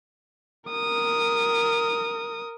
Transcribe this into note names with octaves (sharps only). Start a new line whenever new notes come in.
A#4 D#6